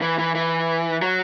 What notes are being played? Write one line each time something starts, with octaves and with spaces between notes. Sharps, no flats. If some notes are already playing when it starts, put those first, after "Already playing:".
E3
E3
E3
F#3